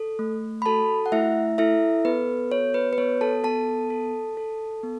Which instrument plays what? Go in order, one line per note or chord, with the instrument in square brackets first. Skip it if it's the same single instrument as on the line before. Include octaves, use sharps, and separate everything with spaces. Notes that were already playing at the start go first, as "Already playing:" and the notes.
Already playing: [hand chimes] A4
A3
B5
F#4 A4 A5
F#5
A3 E4 E5
E4 A4 E5
B3 B4
F#4 C#5
B4
B4
B3 C#5
A4 A5
B3 A4 A5
A4
A4
B3